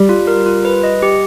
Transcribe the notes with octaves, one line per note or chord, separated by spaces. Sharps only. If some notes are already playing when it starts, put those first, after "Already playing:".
Already playing: G3
F4
A#4
F4
B4
D#5
G4